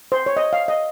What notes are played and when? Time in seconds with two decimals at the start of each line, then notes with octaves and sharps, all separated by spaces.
0.12 C5
0.26 C#5
0.37 D#5
0.53 F5
0.68 D#5